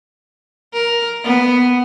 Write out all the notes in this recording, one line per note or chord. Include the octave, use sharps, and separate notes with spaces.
A#4
B3